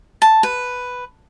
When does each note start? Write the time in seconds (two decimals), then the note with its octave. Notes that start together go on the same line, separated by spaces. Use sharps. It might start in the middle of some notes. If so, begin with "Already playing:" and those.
0.22 A5
0.43 B4